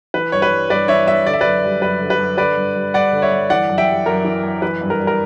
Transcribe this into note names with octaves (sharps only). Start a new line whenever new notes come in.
E3 B4
G2 C#5
B4
G3
G2 B4 D5
E3 C#5 E5
G2 C#5 E5
D3 D5
E5
F#2 B4 D5
G3
F#2 B4
D3
B4
F#2
D3 B4 D5
G2
G3
G2 D5 F#5
D3
C#5 E5
G2
E3 D5 F#5
F#2
E5 G5
G3
F#2 A#4
E3
F#2
E3 B4
G2
A#4
G3
A#4